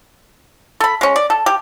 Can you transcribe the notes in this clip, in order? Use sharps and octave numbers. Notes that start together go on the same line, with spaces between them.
A4 B5
G#3 C#4
D5
A4
G4